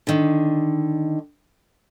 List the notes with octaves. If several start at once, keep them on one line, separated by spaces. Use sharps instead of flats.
D3 D#3